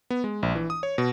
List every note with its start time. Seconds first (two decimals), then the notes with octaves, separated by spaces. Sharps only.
0.10 B3
0.24 G#3
0.43 A#1
0.55 E3
0.70 D#6
0.83 C#5
0.98 B2